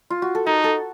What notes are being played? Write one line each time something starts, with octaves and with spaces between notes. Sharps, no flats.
F4
F#4
A4
D#4 A#4
A4